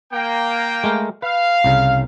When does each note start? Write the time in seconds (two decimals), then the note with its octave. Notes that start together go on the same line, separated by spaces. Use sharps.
0.12 A#3 G5
0.84 G#3 A3 A#4
1.22 B4 F5
1.64 C2 C#3